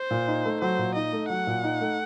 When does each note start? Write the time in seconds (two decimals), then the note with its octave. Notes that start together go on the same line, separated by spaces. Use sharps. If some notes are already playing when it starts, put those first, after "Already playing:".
Already playing: C5
0.11 A#2
0.28 D#4
0.45 A3
0.61 F#3 C5
0.78 A#2
0.96 D#4 D#5
1.13 A3
1.30 F#3 F#5
1.47 A#2
1.64 D#4
1.81 A3